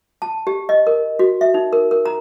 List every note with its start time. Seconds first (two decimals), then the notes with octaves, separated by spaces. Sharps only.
0.22 A5
0.47 G4
0.69 D#5
0.87 A#4
1.19 F#4
1.41 E5
1.54 D#4
1.73 A#4
1.91 A#4
2.06 A#5